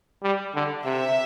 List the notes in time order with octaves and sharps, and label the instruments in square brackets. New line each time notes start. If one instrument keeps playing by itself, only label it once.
[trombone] G3
D3
[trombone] C3 [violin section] E5